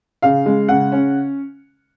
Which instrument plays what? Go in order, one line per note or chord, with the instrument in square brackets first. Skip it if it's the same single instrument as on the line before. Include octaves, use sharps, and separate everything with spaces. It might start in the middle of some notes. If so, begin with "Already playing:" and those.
[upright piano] C#3 F5
G#3
C#3 F#5
C#4